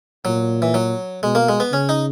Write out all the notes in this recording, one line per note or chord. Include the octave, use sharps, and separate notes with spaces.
A#2 F#3
E3
F#3
B2 G#3
A#3
G#3
B3
C#3 C#4
D#4